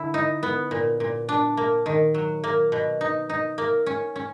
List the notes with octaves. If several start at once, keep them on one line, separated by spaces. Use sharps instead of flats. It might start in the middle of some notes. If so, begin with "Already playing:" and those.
Already playing: D3 E4
D#4
B3
A#2
A#2
D4
A#3
D#3
F#3
A#3
B2
D#4
D#4
A#3
C#4
C#4